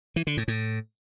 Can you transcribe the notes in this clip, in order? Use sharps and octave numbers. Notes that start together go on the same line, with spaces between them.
E3
D3
A2
A2